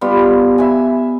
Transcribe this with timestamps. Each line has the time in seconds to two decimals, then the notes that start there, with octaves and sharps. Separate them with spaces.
0.01 G3 B3 F4
0.58 E5 G#5